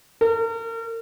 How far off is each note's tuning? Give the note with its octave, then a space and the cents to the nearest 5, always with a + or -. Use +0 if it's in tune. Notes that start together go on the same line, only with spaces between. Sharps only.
A#4 -35